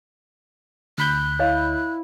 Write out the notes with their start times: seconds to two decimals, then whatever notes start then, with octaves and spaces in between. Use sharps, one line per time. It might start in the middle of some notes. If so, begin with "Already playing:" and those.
0.98 D2 B5 F#6 G6
1.39 E4 C#5 D#5 F5